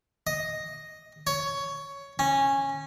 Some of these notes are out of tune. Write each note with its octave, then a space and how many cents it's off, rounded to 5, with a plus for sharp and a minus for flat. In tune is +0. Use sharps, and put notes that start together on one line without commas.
D#5 +0
C#5 +10
C#4 -15